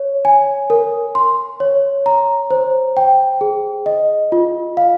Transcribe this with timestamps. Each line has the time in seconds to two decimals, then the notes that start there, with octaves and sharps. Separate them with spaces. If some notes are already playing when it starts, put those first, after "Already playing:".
Already playing: C#5
0.25 G#5
0.70 A#4
1.15 C6
1.60 C#5
2.06 A#5
2.51 C5
2.97 G5
3.41 G#4
3.86 D#5
4.32 F4
4.77 F5